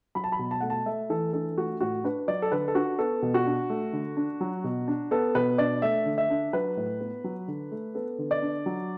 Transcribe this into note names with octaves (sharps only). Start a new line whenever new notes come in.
F#3 B5
A5
B5
B2
A5
A3 F#5
A5
A3 E5
E3 A4
D4 A4
A3 F#4
A2 F#4
D4 B4
F#3 D5
A4
D3 B4
A4
D4 F#4
B3 A4
B2
F#4
D4
A3
D3
D4
F#3
B2
D4
B3 A4
B2 B4
D4 D5
A3 E5
D3
E5
D4
F#3 B4
A2
B3
F#3
D3
A3
B3 A4
D3
D5
D4
F#3